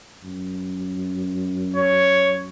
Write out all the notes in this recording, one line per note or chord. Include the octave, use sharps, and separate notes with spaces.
F#2
C#5